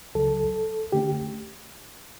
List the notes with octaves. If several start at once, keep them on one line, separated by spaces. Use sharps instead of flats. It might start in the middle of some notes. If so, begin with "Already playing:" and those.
C#2 C#3 F#3 A4
D3 A3 C#4 G4